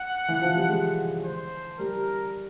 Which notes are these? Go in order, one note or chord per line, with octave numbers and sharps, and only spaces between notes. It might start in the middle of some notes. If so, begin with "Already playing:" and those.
Already playing: F#5
E3
F3
G3
G#3
C5
G3 A#4